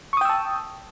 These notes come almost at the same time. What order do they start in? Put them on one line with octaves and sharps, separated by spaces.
C#6 D#6 G5 E6 A5